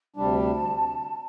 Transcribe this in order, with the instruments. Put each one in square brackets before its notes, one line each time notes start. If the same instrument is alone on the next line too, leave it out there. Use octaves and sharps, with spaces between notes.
[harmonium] D2 C3 G3 D4 [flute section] A5